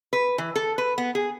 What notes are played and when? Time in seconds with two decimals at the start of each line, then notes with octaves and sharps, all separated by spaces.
0.13 B4
0.38 E3
0.56 A4
0.78 B4
0.98 B3
1.15 G#4